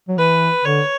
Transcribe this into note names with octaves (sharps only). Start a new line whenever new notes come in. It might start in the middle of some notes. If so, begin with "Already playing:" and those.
F#3
E3 B4
D3 C#5